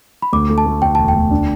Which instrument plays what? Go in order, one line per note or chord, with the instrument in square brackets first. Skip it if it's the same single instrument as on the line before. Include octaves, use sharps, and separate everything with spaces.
[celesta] B5
[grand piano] D2 [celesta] D6
[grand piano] A3
[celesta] A5
[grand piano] A3
[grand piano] D2 [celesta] G5
[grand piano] E1 [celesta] A5
[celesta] G5
[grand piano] D2
D4